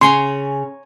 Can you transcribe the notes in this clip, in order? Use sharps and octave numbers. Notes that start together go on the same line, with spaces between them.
C#3 C#5 G#5 A#5 C6